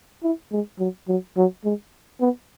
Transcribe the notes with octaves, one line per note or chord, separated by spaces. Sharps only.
E4
G#3
F#3
F#3
F#3
G#3
B3